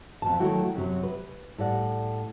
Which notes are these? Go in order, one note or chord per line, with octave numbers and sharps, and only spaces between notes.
F2 B2 A5
D#3 F#3 A3 E4 F#4 G5
F#2 C3 F#3
B4
A2 G3 D5 F#5